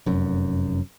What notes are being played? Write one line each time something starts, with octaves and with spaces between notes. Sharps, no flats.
F1 F#2